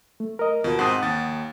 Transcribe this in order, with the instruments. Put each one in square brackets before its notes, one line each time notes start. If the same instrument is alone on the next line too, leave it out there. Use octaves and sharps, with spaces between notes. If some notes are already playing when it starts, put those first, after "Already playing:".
[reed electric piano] A3
A#4 D#5
[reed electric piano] D#2 F4 A#4 [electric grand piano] B2
[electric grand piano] G#2 C4 [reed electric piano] F#5 A5 D#6
[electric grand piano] D#2 A6